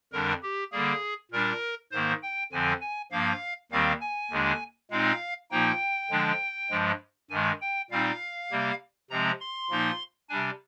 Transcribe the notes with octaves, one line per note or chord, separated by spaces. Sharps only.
F2 D3 G3 D4 A#4
G4
D3 G3 A#3 G#4
A#2 G3 D4 A#4
G#2 D#3 A#3 C5
G5
F2 D3 F3 C4 G#5
G#5
G2 F3 A#3 F5
D#2 D#3 G3 C4 F5
G#5
D#2 D3 G#3 D4
A#2 G#3 C4 D#4 F5
A#2 F3 A#3 D#4 G5
D3 F3 G#3 D4
G2 F3 G#3
G2 D#3 G#3 G#5
G5
A#2 G3 C4 D#4 F5
C3 G3 A#3
C3 F3 G#3 C4 A#5
C6
A#2 F3 A#3 D#4
C3 G3 D4 G#5